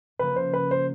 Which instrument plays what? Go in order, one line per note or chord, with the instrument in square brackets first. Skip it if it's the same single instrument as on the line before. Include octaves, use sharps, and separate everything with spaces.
[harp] C#3 F3 A#3 [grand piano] B4
[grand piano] C5
B4
C5